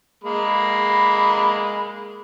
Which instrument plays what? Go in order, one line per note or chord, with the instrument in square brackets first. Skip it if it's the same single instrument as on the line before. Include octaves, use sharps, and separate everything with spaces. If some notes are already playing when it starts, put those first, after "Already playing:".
[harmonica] G#3 A#3 [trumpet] B5